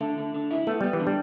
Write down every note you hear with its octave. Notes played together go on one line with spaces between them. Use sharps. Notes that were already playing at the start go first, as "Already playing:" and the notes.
D3 A3
D3
D3
E4
A3 B3
G3 B3
E3
D3
G3